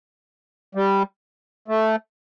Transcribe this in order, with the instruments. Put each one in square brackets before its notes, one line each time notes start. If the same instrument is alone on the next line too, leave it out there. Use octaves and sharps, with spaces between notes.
[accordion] G3
A3